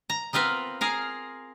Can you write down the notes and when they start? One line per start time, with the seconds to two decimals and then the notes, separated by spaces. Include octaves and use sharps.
0.10 A#5
0.33 B3 C4 F4 A#4 B4
0.81 G#4 A#4 F5